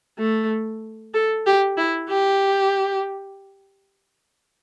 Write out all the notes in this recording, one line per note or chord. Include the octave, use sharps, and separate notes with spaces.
A3
A4
G4
E4
G4